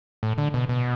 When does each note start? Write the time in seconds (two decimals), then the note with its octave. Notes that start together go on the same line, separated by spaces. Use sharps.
0.23 A2
0.38 D3
0.54 B2
0.69 B2